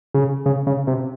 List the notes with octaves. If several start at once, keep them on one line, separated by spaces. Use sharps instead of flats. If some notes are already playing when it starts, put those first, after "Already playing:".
C#3
C#3
C#3
C3